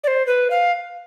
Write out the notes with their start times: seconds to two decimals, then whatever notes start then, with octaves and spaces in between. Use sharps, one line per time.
0.04 D5
0.08 C5
0.27 B4
0.50 F5